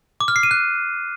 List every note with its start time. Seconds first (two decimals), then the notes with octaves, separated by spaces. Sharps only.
0.20 D6
0.28 F6
0.36 C7
0.43 D#7
0.51 F#6